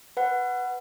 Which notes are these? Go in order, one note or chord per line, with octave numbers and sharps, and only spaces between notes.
B4 F#5